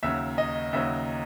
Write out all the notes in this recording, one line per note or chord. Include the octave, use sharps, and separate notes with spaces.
D#2 C#3 F#3 E5
D#5
D#2 C#3 F#3 E5